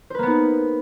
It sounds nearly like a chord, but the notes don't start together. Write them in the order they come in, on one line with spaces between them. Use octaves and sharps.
C5 B4 A#3 B3 D#4